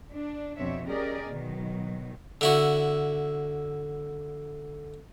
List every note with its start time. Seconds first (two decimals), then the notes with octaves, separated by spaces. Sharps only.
0.12 D4
0.57 F2 B2 C4 D4 C#5 E5
0.86 C#4 G4 G#4 A#4 D5 D#5
1.29 B2 D#3 F#3
2.41 D3 E4 F#4